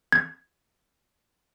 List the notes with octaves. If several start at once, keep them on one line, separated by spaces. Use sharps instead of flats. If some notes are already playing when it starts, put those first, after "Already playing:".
G#6